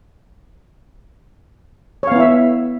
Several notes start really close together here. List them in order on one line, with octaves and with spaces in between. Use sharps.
C#5 F5 B3 E4 E5